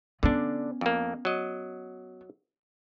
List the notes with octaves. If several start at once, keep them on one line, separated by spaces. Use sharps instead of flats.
D3 B3 C#4 D4
F2 A#3
F#3 D#5